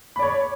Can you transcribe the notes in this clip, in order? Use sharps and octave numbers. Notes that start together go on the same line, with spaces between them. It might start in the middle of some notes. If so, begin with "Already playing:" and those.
C#5 D5 B5